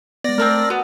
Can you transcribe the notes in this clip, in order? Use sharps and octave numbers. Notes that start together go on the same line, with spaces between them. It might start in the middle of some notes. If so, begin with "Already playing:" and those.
G#3 B3 D5 A#6
A3 C4 D4 A#4
B3 F#4